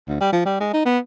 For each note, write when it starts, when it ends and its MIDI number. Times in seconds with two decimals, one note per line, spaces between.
0.08 0.17 38
0.20 0.30 55
0.32 0.41 53
0.46 0.59 55
0.60 0.73 56
0.73 0.81 63
0.85 0.98 59